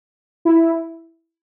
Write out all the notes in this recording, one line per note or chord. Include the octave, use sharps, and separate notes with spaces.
E4